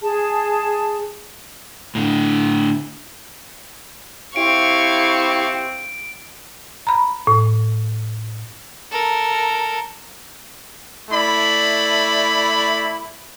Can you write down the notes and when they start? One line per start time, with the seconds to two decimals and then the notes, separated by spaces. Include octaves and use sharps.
0.01 G#4 A5
1.95 A2 D3
4.36 C4 E4 G4 F5 C#6 D7
6.87 A#5 B5
7.27 A2
8.92 A4 A#4
11.10 A3 E4 D5 B5